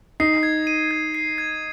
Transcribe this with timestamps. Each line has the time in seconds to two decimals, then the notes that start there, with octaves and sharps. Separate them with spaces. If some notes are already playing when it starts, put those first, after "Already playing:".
0.20 D#4 C7
0.43 G#6
0.67 D#7
0.91 G#6
1.15 C7
1.38 G#6